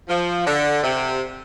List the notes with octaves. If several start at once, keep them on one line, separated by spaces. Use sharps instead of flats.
F3
D3
C3